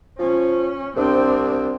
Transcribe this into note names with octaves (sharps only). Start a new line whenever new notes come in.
F3 C#4
C2 C4 D4